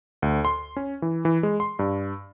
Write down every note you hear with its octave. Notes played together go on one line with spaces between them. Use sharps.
D2
C6
C#4
E3
E3
G#3
C6
G2